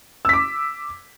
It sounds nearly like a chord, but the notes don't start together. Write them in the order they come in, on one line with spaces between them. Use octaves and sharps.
E6 B6 D6